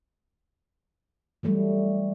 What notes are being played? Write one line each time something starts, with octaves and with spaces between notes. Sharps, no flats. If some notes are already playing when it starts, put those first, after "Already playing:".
E3 F#3 G3 A3